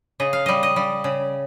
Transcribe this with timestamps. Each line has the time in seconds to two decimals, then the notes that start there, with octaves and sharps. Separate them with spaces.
0.20 C#3 D#5
0.33 F5
0.46 G3 D#5
0.63 D#5
0.76 G3
1.04 C#3